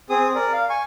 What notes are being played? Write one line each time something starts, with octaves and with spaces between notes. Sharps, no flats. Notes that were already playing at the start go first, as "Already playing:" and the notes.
C4 G#4 D#6
A#4 D5
F5
G#5 C#6